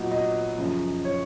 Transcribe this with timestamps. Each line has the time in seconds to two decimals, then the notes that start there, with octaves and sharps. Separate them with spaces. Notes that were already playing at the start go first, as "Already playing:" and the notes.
Already playing: A#2 F#3 B3 D#4
0.12 D#5
0.58 F#2 C#3 F3
1.05 C#5